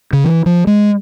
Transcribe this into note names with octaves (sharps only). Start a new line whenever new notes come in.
C#3
E3
F3
G#3